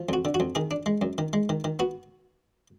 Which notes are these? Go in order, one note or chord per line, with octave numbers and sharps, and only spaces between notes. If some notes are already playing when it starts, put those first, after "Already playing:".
Already playing: F3
F2 F#4
D3
F#4
F2
D#3 G#4
D4
G#3
F#2
D#3
G#3
D#3
D#3
B3 F#4